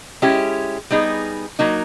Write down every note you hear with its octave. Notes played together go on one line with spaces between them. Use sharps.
G#3 C#4 E4 G4
G3 B3 D#4 G#4
F#3 A#3 D#4